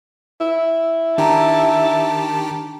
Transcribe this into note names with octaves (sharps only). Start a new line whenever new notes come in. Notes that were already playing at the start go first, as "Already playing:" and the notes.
E4
D#3 D4 G4 A5 A#5